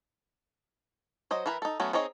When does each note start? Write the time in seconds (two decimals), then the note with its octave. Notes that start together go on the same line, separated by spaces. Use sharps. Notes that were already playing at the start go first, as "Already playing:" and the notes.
1.31 F#3 C5 D#5
1.46 E3 E4 A#4 B4
1.62 D#4 A4
1.80 F#3 A3 B3 C#4
1.93 C4 D#4 G#4 C#5 D#5